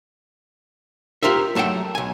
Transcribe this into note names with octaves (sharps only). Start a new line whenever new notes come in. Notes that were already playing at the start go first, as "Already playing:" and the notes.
F4 G4 A#4 C5 E5
F#3 A3 E5 F#5 G5
B1 G#5